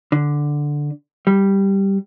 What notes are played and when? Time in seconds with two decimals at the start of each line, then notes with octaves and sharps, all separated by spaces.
0.12 D3
1.27 G3